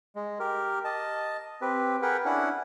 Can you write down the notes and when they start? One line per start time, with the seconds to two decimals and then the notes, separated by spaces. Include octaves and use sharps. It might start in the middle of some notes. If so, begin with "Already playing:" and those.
0.16 G#3
0.40 G4 A#4
0.84 D#5 A5
1.62 C4 G4 B4
2.02 G#4 A#4 B4 F#5 G5
2.25 C#4 D4 E4 F#5